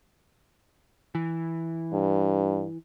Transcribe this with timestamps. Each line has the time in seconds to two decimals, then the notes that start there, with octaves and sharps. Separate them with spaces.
1.15 E3
1.93 G2